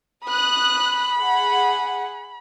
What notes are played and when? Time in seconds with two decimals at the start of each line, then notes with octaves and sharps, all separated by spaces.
0.25 B5 D#6 F#6
1.18 G#4 F#5